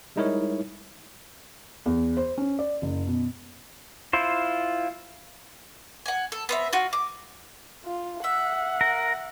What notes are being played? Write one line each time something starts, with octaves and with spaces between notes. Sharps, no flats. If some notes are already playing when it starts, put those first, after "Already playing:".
G3 G#3 D#4 E4 A#4 C#5
E2
C5
C#4
D5
F#1
B2
E4 F4 C5
F#5 G#5
A4
B3 C4 E5
F4 F#4
D6
F4
E5 F#5
A#4